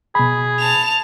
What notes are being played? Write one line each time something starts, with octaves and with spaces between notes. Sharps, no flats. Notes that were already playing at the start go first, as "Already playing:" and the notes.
B2 G#4 B5
A5 F7